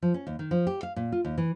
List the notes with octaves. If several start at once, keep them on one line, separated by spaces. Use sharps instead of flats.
F3
C#4
D#2
D#3
F3
G4
F5
A#2
F4
D#2
E3